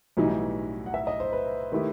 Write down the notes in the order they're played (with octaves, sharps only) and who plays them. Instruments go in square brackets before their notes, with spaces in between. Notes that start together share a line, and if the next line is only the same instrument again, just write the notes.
[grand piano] B1 A2 E3 G3 D#4 [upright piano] F#4
[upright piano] F#5
E5
D#5
C5
B4
[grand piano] D#3 A3 E4 G4